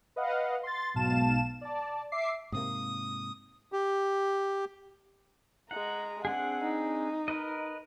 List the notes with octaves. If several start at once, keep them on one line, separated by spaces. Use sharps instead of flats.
B4 D#5 F5 F#5
C6 A6
B1 G#2 B2 F5 A5 E7
D5 A5
E5 D6 C7
G#2 C3 A#3 D#6
G4
G#3 F#5 A#5
C4 D4 G#4 F#5
D#4
A#4 B4 D#5